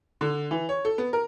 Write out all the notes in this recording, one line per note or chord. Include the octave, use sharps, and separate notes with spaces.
D3
E3
C#5
A4
B3
A#4